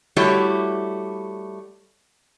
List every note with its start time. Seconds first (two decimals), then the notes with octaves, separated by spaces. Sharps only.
0.16 G3 A3 E4 F#4 G4 C#5